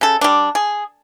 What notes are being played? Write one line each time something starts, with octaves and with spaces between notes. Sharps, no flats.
C#3 A4
G3 D4
G#4